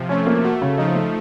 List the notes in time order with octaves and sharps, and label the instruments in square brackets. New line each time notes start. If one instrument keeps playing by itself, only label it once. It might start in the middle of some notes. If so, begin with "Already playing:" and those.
Already playing: [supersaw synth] C3 F3
[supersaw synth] A3 [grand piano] C#4
[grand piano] A#3
[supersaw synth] A3 [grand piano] F#4
[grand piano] C#3
[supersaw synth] F3 [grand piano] D#4
[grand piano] A3